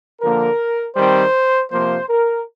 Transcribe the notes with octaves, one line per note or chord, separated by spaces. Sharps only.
D3 F3 A#3 A#4
D#3 G3 C4 C5
C3 F3 A#3 C5
A#4